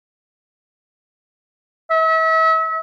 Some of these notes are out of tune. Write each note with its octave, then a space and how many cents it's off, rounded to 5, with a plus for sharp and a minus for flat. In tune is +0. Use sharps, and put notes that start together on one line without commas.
E5 -35